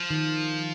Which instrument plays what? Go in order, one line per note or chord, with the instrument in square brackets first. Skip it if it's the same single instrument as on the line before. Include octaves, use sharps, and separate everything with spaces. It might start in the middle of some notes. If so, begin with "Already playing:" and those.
Already playing: [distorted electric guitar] F3
[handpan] D#3